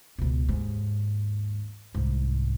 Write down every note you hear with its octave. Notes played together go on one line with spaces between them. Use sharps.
C#2 B2
D#2 G#2
C2 G#2